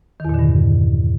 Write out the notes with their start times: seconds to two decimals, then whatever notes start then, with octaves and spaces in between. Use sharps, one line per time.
0.20 D#3
0.25 E2
0.29 A#2
0.34 D3
0.39 G2